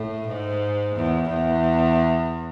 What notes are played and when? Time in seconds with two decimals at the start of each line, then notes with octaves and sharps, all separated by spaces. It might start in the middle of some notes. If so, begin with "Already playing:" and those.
Already playing: A2
0.28 G#2
0.96 E2
1.29 E2